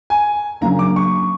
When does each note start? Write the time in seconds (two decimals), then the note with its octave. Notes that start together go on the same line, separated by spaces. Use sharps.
0.10 G#5
0.61 C#3 F#3 A#3 D4 A#5
0.79 D6
0.96 C#6